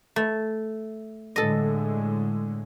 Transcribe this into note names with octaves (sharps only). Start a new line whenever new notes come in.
A3
A2 D3 G#3 A4 D#5